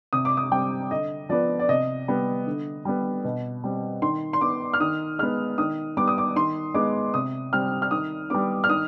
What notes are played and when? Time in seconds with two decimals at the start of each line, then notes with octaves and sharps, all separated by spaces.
0.13 C3 D#6
0.25 D6
0.37 D#6
0.51 G3 C4 G5
0.91 D3 D#5
1.29 F3 B3 D5
1.59 D5
1.69 C3 D#5
2.08 G3 B3
2.47 D3
2.85 G3 B3
3.24 B2
3.64 G3 C4
4.02 D#3 C6
4.33 C6
4.41 B3 D6
4.73 F6
4.80 D#3 D#6
5.19 G#3 B3 F6
5.58 D#3 D#6
5.97 G3 B3 D6
6.08 D#6
6.18 D6
6.36 D#3 C6
6.74 G#3 B3 D6
7.14 C3 D#6
7.53 G3 C4 F6
7.82 F6
7.91 D#3 D#6
8.30 G3 B3 D6
8.64 F6
8.69 D#3 D#6